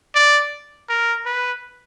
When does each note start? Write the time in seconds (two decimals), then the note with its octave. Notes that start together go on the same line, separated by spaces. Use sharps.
0.15 D5
0.89 A#4
1.26 B4